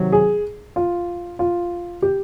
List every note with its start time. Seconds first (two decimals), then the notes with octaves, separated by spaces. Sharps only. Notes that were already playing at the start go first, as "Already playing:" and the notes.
Already playing: C3 D#3 F#3
0.12 G#4
0.76 F4
1.39 F4
2.02 G4